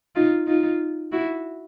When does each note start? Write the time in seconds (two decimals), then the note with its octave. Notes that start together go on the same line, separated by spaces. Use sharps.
0.16 D#4 F4
0.47 D#4 F4
1.12 E4 F#4